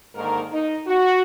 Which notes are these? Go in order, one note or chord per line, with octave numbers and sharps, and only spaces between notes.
G#2 D3 D#3 A#3 A#4
D#4
F#4